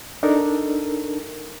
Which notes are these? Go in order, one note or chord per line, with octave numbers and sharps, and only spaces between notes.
D4 D#4 A4 A#4